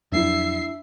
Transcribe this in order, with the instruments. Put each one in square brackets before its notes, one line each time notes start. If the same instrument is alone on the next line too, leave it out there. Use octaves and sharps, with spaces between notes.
[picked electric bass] F2 F#3 A#3 [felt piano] D4 E4 [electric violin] E5 C7